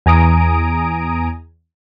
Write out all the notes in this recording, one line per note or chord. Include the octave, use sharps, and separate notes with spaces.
E2 G#5 A#5 D#6 D7